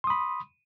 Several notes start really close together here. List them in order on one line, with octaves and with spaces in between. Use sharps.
C6 D#6 B5